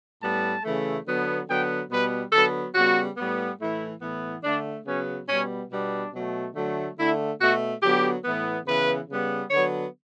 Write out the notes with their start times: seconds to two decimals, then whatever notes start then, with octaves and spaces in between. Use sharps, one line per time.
0.21 A2 G3 B3 A5
0.64 C#3 E3 A3
1.06 D3 F#3 B3
1.48 D3 F#3 B3 G5
1.90 B2 G3 B3 B4
2.32 D3 F#3 B3 A4
2.75 C#3 G3 B3 F#4
3.17 A2 G3 B3
3.60 A2 E3 A3 E4
4.01 A2 E3 B3
4.44 D3 A3 D4
4.86 C#3 F#3 B3 C#4
5.28 B2 G3 B3 C#4
5.70 B2 G3 B3 D4
6.14 B2 F#3 A3
6.55 D3 F#3 A3
6.97 D3 A3 E4
7.40 B2 A3 F#4
7.82 D3 F#3 B3 G4
8.25 A2 E3 B3
8.66 C#3 E3 B3 B4
9.09 C#3 G3 B3
9.51 D3 F#3 B3 C#5